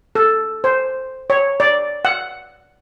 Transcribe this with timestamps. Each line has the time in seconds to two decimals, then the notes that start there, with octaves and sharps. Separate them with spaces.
0.15 A4
0.64 C5
1.30 C#5
1.60 D5
2.05 F#5